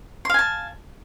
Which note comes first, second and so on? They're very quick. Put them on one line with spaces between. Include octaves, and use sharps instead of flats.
C6 F5 G#5 A5